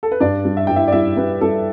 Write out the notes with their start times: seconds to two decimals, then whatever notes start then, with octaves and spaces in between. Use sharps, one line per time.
0.03 A4
0.12 B4
0.20 G2 D4 D5
0.45 G3
0.57 E5
0.67 G2 G5
0.76 E4 E5
0.88 D5
0.92 G3 E4 E5
1.17 G3 B4
1.41 G3 A4